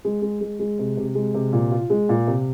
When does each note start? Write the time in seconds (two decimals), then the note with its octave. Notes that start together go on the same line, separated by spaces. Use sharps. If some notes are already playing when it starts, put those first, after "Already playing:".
0.05 G#3
0.22 G#3
0.41 G#3
0.60 G#3
0.79 C3
0.97 C3
1.15 G#3
1.34 C3
1.53 A#2
1.72 F4
1.90 G#3
2.09 A#2
2.27 C3